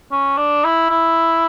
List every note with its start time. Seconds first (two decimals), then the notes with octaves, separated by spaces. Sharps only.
0.12 C#4
0.37 D4
0.64 E4
0.90 E4